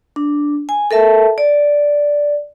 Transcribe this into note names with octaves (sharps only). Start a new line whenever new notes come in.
D4
G#5
A4 A#4 E5 A5
D5